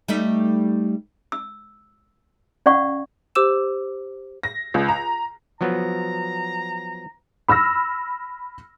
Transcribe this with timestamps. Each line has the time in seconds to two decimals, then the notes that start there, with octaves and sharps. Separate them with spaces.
0.08 G3 A3 D#4
1.32 E6
2.66 C#4 D5 F5 F#5 C#6
3.35 G4 C5 D6 E6 E7
4.43 A#6
4.74 C#2
4.89 A#5
5.61 F3 F#3 B3 A#5
7.48 B5 E6 F6 A#6